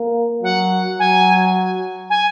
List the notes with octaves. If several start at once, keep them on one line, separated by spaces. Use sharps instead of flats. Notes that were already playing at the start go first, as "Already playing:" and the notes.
Already playing: A#3
F#3 F#5
F#3 G#5
G#5